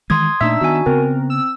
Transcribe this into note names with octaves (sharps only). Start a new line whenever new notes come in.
D#3 E3 G#3 C6 D#6 G#6
A#2 A3 D4 D#4 E5 E6
D#3 B3 F#4 G#5
C#3 B3 C4 A#4
E6